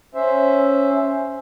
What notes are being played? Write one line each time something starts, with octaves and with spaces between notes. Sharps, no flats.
C#4 C5 E5